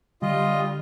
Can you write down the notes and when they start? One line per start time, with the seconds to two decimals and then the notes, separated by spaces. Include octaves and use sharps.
0.22 D3 G3 F4 D#5